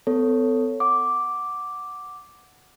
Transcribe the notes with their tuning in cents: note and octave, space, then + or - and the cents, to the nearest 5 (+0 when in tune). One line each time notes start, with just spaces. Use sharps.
B3 +45 A4 +15 C#5 +0
F#5 +0 D6 +0